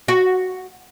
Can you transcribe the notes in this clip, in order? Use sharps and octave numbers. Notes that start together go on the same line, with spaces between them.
F#4